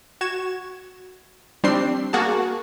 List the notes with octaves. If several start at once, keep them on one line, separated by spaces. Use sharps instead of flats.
F#4 G#6 E7
G3 C4 D4 C6 C7
A#3 F#4 G#4 A5